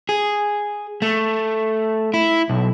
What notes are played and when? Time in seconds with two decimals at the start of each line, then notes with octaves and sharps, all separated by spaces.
0.09 G#4
1.02 A3
2.14 E4
2.50 B1